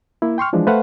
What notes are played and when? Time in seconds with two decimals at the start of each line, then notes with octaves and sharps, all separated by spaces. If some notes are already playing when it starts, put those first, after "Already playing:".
0.22 A#3 E4
0.38 G5 C6 C#6 F6
0.53 E3 F3 G#3 D4
0.67 A3 B4 C5 F5 F#5